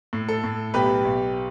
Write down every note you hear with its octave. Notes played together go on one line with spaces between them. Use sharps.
A2
A4
A2
B1 G4 B4
B1